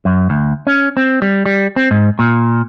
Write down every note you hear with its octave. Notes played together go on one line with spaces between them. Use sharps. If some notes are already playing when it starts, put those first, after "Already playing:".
F#2
D2
C#4
C4
G3
G3
C4
G#2
A#2